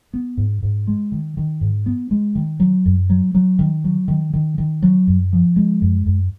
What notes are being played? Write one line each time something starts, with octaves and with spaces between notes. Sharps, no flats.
B3
G#2
G#2
G#3
D#3
D#3
G#2
B3
G#3
D#3
F#3
F#2
F#3
F#3
D#3
F#3
D#3
D#3
D#3
F#3
F#2
F3
G#3
F#2
F#2